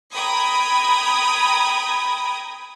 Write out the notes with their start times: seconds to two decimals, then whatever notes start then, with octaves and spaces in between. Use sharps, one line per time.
0.14 G5 A#5 B5 D#6 G#6